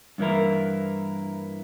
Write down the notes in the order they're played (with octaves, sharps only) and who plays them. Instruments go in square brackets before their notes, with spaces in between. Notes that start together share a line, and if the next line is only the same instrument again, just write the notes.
[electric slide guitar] G2 E3 A#3 E4 A#4